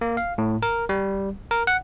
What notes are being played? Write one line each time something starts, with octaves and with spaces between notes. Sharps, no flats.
A#3
F5
A2
A#4
G3
A#4
F#5